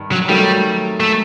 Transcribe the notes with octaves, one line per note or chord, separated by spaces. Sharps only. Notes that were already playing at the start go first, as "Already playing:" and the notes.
Already playing: G2 D#3
F#3
D#3 F#3 G3 A3
A3